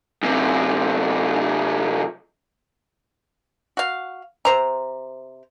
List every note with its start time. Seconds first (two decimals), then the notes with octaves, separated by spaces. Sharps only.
0.23 F#2 C3
3.77 F#4 F5
4.45 C3 C5 A#5